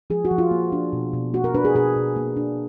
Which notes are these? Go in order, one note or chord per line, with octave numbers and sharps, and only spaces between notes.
F3 G#4
F#4
F3
F4
A#3
D4
B2
B2
A#3 F#4
A#4
D4 B4
G#4
B2 G#4
B2
A#3
D4